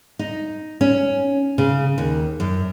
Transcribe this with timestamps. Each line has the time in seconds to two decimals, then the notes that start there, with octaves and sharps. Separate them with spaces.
0.19 D#4
0.81 C#4
1.58 C#3
1.98 D#2
2.40 F#2